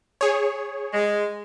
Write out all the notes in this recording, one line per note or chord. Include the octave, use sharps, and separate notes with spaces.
G#4 C#5
G#3